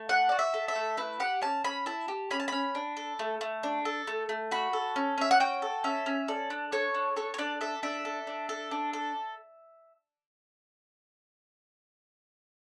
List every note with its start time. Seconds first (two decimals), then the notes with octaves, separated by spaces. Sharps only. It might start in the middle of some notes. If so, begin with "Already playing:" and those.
Already playing: A3
0.09 D4 F#5
0.29 F#4 D5
0.39 E5
0.54 A4
0.68 E5
0.76 A3
0.97 E4 B4
1.20 G4 F#5
1.42 C#4 A5
1.64 C#4 B5
1.86 E4 A5
2.08 G4
2.31 C#4 B5
2.40 A5
2.48 C#4 B5
2.75 D4
2.97 A4
3.19 A3
3.41 A3
3.63 D4
3.85 A4
4.07 A3
4.29 A3
4.51 F#4 B5
4.73 A4
4.96 C#4
5.18 C#4 E5
5.31 F#5
5.40 F#4 G5
5.62 A4
5.84 C#4 E5
6.06 C#4
6.28 A4 D5
6.50 D4
6.72 A4 C#5
6.94 D4
7.16 A4 C#5
7.34 C#5
7.38 D4 D5
7.61 A4 E5
7.83 D4 E5
8.05 A4
8.27 D4
8.49 A4
8.71 D4
8.93 A4